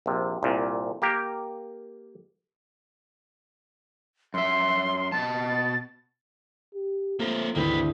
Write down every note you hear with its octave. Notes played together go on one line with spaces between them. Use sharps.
A#1 C3
C2 A#2
A#3 G4 A#4
F#2 E5 C6
B2 A5 A6
G4
A3 A#3 C4 F4
G#1 D2 A#3 C4 E4 B4